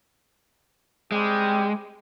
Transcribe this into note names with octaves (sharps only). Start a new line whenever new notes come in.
G3 G#3 C4 G4